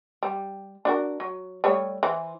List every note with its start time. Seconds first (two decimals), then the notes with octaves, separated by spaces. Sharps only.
0.23 G3
0.85 D4 F#4 A#4
1.20 F#3
1.64 G3 A3 C#5
2.03 E3 C5